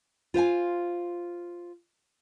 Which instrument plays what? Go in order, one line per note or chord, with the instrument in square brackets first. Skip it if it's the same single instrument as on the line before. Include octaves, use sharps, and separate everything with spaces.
[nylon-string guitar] F4 C5 F5 G#5